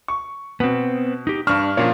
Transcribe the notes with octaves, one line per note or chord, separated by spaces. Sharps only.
C#6
B2 B3 C4
D#4 G4
G2 D4 C#6 F6
A#2 F3 A#3 C#4 D4 C#5